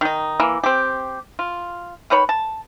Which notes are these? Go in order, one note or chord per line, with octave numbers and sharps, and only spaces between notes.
D#3 D#4
E3 A#3
C4 G4
F4
D#3 B4 C#5 B5
A5